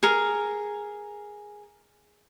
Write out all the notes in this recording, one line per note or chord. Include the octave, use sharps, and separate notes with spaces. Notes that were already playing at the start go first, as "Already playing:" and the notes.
G#4 A#4